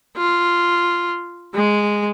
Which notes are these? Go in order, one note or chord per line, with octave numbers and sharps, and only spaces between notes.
F4
G#3